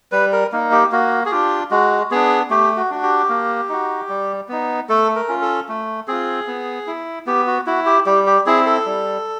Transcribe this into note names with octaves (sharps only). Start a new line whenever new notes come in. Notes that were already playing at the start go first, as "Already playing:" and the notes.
G3 B4
A#4
A#3 D#4
G4
A#3 F#4
G#4
D4 F4 G4
G#3 F#4
B3 D4 G#4
A3 G4
F#4
D4 F#4
G4
A#3
D#4 F#4
G3
B3 D#4
A3 A4
A#4
C#4 F4
A4
A3
C4 F4 G#4
B3
E4
B3 G4
F#4
E4 F#4
G4
G3 G4
G4
C4 E4 G#4
A4
G3